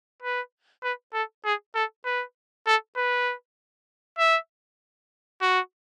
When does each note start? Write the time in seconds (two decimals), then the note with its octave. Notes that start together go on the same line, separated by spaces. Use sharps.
0.23 B4
0.83 B4
1.13 A4
1.45 G#4
1.75 A4
2.05 B4
2.67 A4
2.97 B4
4.19 E5
5.42 F#4